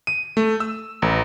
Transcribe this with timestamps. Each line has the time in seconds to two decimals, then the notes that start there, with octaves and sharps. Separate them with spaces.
0.07 D#7
0.37 A3
0.60 E6
1.02 A1